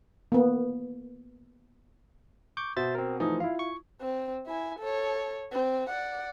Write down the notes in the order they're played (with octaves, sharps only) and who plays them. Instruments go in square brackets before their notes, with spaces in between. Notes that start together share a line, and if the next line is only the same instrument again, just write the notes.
[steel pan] A#3 B3
[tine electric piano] C#6 D6 G6
[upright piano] B2 [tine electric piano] C5 E5 A6
[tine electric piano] C4 A#4
[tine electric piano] E3 F3 A3 [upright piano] D#4
[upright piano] E4 F4 [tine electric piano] F5
[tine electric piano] C#6
[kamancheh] C4
E4 G#5
A4 C#5
C4
D5 F#5